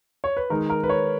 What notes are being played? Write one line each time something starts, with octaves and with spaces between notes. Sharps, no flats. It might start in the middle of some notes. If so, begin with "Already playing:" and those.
C#5
B4
D#3 G#3 D#4 A#4
A#4
B4
C#5